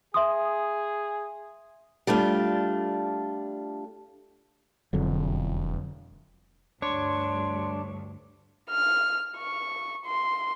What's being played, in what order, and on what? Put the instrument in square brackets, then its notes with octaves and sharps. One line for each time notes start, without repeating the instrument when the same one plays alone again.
[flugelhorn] G#4 [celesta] E5 C6 D#6
[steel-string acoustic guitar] G3 A3 D4 F4
[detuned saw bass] E1 [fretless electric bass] F2 D3 F#3
[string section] D2 G2 [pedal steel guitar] D4 [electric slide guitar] C#5 [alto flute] C6
[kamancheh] F6
C#6
C6